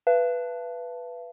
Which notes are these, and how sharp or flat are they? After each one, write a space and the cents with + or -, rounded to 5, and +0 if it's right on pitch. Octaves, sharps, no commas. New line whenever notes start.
B4 +0 F5 -45 A5 +0